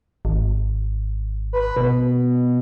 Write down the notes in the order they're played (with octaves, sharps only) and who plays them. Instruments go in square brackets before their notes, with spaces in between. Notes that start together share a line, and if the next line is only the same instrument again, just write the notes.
[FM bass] G#1
[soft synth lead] B4
B2